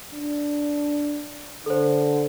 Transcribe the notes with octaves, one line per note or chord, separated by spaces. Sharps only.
D4
D3 A4 C5